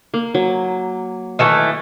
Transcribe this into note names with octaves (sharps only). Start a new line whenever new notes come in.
A#3
F#3
D#3 E3 A3